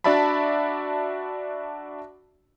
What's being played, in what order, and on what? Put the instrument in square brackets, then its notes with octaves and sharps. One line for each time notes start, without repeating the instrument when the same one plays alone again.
[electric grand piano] D4 F#4 D5 E5 A5 B5